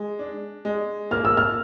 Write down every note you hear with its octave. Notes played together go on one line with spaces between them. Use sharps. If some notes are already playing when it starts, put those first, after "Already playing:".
Already playing: G#3
D4
G#3
A#3 F6
E6
F6